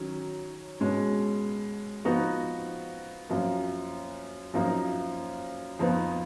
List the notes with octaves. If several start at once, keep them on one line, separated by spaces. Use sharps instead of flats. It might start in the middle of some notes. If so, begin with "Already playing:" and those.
Already playing: D#3 F#3 C#4
B2 G#3 C#4
F3 B3 D#4 F#4
F#2 F3 A#3
F#2 F3 A#3 D#4
F2 F3 B3 D#4